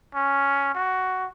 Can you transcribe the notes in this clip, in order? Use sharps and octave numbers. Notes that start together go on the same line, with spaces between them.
C#4
F#4